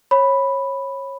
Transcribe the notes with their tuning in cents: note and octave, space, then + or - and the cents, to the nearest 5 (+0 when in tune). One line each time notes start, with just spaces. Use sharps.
C#5 -25 B5 +0